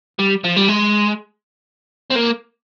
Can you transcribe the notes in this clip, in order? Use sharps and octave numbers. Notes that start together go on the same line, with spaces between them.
G3
F3
G3
G#3
C4
A#3